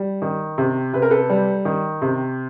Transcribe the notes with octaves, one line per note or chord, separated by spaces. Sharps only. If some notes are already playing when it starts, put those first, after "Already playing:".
Already playing: G3
D#3
C3
C3 B4
A#4
A4 B4
G3
D#3
C3